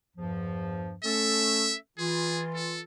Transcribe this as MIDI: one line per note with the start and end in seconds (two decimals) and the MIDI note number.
0.16 0.95 40
0.16 0.95 43
0.16 0.95 53
1.04 1.75 57
1.04 1.75 61
1.04 1.75 69
1.04 1.76 76
1.98 2.84 52
1.98 2.84 65
1.98 2.44 68
2.55 2.81 69